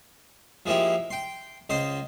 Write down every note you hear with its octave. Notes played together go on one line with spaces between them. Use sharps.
F3 G#3 A#3 E4 G4
G5 C6
C#2 C5 D#5 C6 D#6